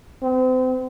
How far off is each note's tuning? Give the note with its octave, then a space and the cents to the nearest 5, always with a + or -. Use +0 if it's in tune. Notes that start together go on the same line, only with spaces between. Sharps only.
C4 -35